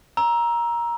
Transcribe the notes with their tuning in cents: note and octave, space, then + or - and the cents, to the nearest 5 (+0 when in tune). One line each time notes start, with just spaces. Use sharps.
A#5 +15 E6 +0